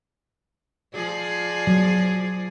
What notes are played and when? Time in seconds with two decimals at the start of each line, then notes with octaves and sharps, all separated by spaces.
0.95 F3 G#4 D5
1.67 F#3